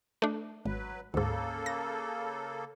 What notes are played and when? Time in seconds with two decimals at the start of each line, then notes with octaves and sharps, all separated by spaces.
0.22 A3 D4
0.65 G#1 F#3 B4
1.14 D2 G#2 C#3 A#3 A4
1.66 A#6